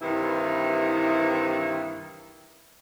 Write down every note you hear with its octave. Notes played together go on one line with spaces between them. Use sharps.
G2 C3 D#3 E3 E4